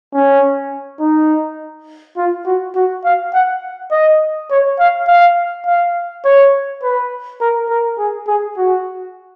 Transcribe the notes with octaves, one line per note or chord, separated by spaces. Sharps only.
C#4
D#4
F4
F#4
F#4
F5
F#5
D#5
C#5
F5
F5
F5
C#5
B4
A#4
A#4
G#4
G#4
F#4